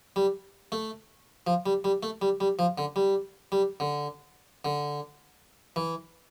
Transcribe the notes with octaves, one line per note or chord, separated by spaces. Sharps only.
G3
A3
F3
G3
G3
A3
G3
G3
F3
D3
G3
G3
D3
D3
E3